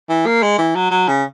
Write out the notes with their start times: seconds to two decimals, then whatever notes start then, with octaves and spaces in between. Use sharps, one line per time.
0.09 E3
0.26 A#3
0.43 G#3
0.58 E3
0.75 F#3
0.91 F#3
1.08 C#3